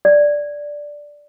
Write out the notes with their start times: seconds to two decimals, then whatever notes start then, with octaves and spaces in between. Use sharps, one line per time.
0.05 D5